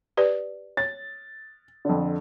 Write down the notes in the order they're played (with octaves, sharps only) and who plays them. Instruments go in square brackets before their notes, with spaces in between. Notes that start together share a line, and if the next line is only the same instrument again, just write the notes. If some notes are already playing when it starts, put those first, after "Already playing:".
[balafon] G4 B4 D5
[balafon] C#5 [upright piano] A6
[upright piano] F2 D3